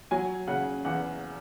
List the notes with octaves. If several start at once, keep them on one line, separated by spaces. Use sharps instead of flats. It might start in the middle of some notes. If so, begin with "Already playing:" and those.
F#3 G#5
C#3 F#5
E2 F#5